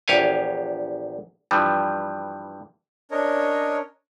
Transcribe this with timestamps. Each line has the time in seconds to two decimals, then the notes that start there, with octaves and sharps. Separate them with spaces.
0.08 A#1 E2 G4 C#5 F5 G#5
1.51 G2 E3 F3 G3
3.11 C#4 D4 A#4 C#5 D#5